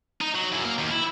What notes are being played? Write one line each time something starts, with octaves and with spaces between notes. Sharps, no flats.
D#4
F#3
F#2 E4
A#3
D#2
E4